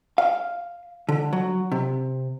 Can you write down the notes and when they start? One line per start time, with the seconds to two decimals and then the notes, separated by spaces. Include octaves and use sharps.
0.18 F5
1.09 D3
1.33 F#3
1.72 C3